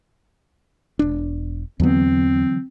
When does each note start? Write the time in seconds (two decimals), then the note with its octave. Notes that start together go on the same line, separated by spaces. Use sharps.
0.99 E1 D4
1.80 E2 D3 E3 F#3 B3 C4